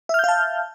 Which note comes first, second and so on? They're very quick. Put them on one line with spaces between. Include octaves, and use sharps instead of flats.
E5 F6 G6 F5 A5